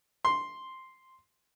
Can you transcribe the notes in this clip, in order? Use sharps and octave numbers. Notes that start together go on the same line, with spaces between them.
C6